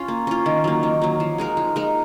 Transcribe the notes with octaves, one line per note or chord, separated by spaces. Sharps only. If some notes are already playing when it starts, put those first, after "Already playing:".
Already playing: C#4 F4
A#3
C#4 F4
D#3
F#3 A#3
D#3
F#3 A#3
F3
G#3 D#4 A#4
F3
G#3 D#4 A#4